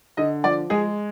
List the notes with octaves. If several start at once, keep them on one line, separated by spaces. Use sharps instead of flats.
D3 D#5
F3 D5
G#3 G#4